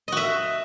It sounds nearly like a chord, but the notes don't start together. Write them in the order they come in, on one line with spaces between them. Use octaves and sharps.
D#5 F#4 E5